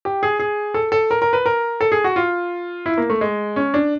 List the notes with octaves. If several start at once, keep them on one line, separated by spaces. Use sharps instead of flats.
G4
G#4
G#4
A4
A4
A#4
A#4
B4
A#4
A4
G#4
F#4
F4
E4
A#3
A3
G#3
C#4
D4